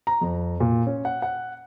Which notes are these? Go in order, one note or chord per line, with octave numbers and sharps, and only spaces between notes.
A#5
F2
A#2
C#4
F#5
F#5